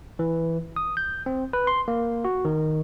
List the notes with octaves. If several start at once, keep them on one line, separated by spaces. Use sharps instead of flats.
E3
D#6
G6
C4
B4
C6
A#3
F#4
D#3